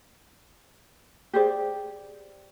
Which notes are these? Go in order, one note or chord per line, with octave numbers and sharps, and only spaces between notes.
G4 G#4 C5 D5